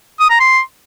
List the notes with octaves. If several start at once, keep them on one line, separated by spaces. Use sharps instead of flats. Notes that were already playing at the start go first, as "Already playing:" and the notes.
D#6
A#5
C6